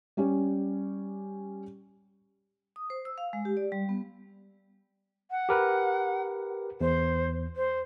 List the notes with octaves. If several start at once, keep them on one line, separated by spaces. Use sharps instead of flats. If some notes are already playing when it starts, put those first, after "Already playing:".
G3 C#4 G4 C#5
D#6
C5
E6
F5
G#3
G4
D5
G3
B3
F#5
G4 A#4 B4
E2 C5
C5